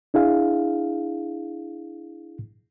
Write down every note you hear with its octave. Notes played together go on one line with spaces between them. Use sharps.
D4 E4 G#4 F5